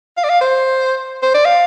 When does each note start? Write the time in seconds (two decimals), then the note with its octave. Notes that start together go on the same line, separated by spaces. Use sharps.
0.17 F5
0.24 D5
0.29 F5
0.41 C5
1.23 C5
1.34 D5
1.45 F5